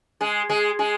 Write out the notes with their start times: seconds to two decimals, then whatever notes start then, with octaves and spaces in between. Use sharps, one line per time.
0.21 G#3 G#4
0.49 G#3 G#4
0.79 G#3 G#4